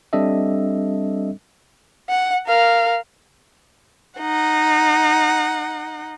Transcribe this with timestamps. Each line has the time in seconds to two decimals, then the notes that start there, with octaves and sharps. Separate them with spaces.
0.13 G3 C4 D4 A4 D#5 E5
2.10 F#5
2.47 A#4 F5
4.20 D#4 F#5